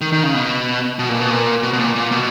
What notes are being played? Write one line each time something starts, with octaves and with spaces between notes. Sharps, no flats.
D#3
D#3
C#3
B2
B2
A#2
B2
A#2
B2
B2
A#2
A#2
B2